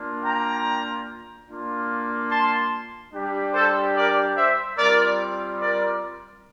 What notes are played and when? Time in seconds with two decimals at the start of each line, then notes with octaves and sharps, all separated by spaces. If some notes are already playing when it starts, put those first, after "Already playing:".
Already playing: A#3 D4 F4
0.22 G5 A#5
1.47 A#3 D4 F4
2.29 A5 C6
3.12 G3 D4 G4
3.53 A4 C5
3.95 A#4 D5
4.36 C5 E5
4.78 G3 C4 F4 A#4 D5
5.60 A#4 D5